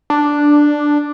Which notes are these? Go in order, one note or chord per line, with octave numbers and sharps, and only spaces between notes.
D4